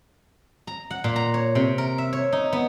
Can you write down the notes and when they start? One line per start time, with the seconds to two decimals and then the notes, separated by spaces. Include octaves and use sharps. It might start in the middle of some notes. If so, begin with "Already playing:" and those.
0.67 A#5
0.91 F#5
1.04 A#2
1.16 A#5
1.34 C#5
1.55 C3
1.78 A#4
1.98 E5
2.13 C#5
2.32 D#4
2.52 B3